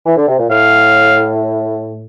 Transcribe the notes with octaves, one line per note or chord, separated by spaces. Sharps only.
E3
D3
C3
A#2
A2 F5